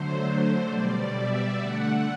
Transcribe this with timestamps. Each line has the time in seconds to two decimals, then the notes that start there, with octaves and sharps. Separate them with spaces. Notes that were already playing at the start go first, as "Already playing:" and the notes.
Already playing: D3 F#3 A3 C5
0.24 C5
0.68 B2 G3 D5
1.13 E5
1.57 D3 A3 F#5